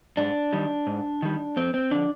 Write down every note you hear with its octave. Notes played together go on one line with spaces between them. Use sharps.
G#2 D4
D#3 G3
G#2
D#3 G3
F2 C4
C4
D3 F3 D4